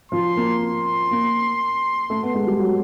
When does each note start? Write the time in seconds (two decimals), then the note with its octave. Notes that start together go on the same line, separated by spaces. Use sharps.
0.12 F3 C6
0.37 A#3
0.62 C6
1.11 A#3
2.10 A3
2.23 B3
2.35 G#3
2.47 G3
2.60 F#3